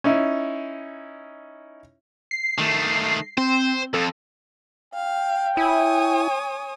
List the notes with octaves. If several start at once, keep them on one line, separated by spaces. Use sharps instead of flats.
C#4 D#4 E4
C7
D#3 A3
C4 C5
F2 A4
F5 G5
E4 C#5 G#5 D#6